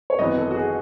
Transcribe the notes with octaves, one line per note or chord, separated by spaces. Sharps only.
C#5
G#1 F#2 E3 B3 E4 D#5
A4
F#4
G#4